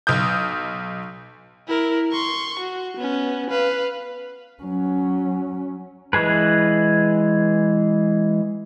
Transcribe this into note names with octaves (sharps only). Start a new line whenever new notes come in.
B1 D#6 G6
E4 A#4
C6 C#6
F#4
B3 C#4
B4 F5
F#3 C#4
E3 G#3 G#4 B4